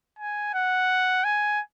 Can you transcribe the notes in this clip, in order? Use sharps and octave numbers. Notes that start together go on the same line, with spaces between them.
G#5
F#5
G#5